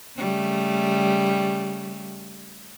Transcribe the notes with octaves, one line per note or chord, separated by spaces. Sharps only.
C#3 G3 A3